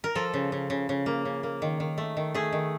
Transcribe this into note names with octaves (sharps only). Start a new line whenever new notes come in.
A#4
F3 A4
C#3
C#3
C#3
C#3
A#3
C#3
A#3
D#3
D#3
A3
D#3
A3 G#4
D#3